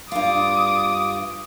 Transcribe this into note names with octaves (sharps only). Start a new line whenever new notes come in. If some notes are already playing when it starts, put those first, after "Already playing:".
G2 F4 D6 D#6